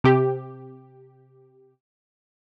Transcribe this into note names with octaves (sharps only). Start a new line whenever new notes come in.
C3 G4